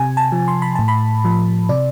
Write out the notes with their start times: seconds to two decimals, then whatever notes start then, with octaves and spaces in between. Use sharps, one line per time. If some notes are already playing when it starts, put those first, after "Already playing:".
Already playing: C3 G#5
0.17 A5
0.32 F3
0.48 C6
0.62 B5
0.75 A2 A5
0.88 B5
1.25 F3
1.69 C3 D5